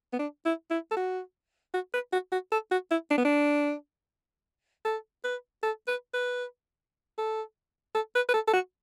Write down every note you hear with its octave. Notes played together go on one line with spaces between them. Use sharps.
B3
D4
E4
E4
A4
F#4
F#4
B4
F#4
F#4
A4
F#4
E4
D4
B3
D4
A4
B4
A4
B4
B4
A4
A4
B4
B4
A4
A4
F#4